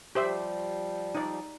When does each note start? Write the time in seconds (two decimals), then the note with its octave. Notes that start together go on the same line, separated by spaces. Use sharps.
0.15 F3 G3 G4 C5 E5
1.15 D#4 D5